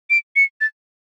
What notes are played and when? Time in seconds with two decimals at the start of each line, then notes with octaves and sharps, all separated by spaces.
0.10 D7
0.36 C#7
0.61 A6